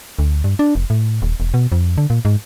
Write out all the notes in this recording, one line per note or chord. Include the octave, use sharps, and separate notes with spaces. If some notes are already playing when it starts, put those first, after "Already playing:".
D2
G2
D4
F1
A2
D#1
E1
B2
F2
D3
A#2
G#2